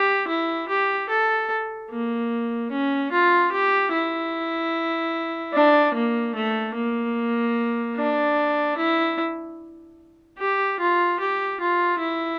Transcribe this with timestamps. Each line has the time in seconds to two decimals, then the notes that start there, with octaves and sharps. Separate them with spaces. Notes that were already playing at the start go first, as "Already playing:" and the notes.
Already playing: G4
0.27 E4
0.68 G4
1.09 A4
1.90 A#3
2.71 C#4
3.12 F4
3.52 G4
3.92 E4
5.53 D4
5.94 A#3
6.35 A3
6.75 A#3
7.96 D4
8.77 E4
10.38 G4
10.80 F4
11.20 G4
11.60 F4
12.00 E4